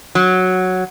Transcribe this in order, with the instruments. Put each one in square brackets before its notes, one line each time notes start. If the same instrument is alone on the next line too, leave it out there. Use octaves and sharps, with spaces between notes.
[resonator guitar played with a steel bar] F#3